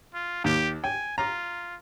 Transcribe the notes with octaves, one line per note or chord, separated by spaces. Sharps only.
F4
D#2 G4
G5 G#5
F4 A#5